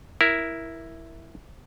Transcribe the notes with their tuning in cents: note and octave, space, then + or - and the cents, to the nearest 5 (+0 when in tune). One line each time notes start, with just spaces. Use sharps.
E4 +0 A#4 +10